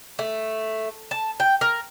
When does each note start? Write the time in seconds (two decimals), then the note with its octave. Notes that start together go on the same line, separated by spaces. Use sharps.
0.19 A3
1.11 A5
1.40 G5
1.61 A#4